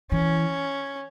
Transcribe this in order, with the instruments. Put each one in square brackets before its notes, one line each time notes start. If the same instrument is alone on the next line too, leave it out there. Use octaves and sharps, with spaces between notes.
[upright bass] E3 [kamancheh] C#4